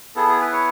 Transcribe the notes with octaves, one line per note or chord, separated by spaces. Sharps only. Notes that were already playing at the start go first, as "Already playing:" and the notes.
B3 E4 G#4 A4
G#4
B4
C#5